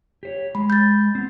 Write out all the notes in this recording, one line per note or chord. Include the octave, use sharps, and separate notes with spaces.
G4 C5 C#5
G#3 B5
G6 A6
B3 C4